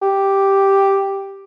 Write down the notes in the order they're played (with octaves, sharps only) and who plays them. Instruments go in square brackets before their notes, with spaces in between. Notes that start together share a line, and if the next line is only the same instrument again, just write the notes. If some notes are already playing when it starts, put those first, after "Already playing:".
[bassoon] G4